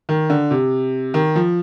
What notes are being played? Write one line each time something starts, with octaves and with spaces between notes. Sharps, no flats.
D#3
D3
C3
D#3
F3